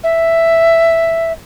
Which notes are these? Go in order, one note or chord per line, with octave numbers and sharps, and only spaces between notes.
E5